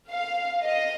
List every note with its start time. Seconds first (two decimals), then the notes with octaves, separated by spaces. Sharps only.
0.10 F5
0.65 D#5